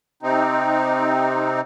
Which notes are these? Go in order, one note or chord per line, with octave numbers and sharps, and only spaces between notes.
C3 C4 D#4